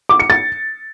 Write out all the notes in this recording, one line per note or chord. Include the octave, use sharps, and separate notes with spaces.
D6
C#7
A6